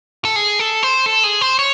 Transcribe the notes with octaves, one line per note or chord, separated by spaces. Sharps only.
A4
G#4
A4
C5
A4
G#4
C5
C#5